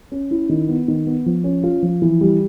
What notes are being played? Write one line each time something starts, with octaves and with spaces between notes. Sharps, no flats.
C#4
E4
D#3
B3
D#3
B3
F3
C#4
F4
F3
E3
G3